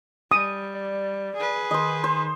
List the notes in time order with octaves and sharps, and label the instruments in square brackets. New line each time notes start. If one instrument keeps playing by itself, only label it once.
[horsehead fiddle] G3 [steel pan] D#6
[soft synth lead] D5
[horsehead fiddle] G#4 B4
[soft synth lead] D#3 [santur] C5 D#5
[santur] C5